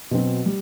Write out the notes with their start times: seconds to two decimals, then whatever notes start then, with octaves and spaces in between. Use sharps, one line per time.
0.11 B2 F#3 C4
0.46 G3